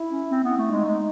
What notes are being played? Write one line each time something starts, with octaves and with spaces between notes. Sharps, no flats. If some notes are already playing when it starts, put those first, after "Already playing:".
Already playing: E4
C#4
C4
B3
A3
G#3 D#4
G#3